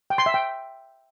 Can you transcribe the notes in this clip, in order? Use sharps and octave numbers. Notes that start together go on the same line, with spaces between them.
G5
C6
E5
G5